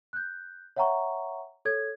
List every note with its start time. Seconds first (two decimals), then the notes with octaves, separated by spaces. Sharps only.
0.13 F#6 G6
0.76 C#5 E5 F#5 G5 A#5 C#6
1.65 A4 C#5 G#6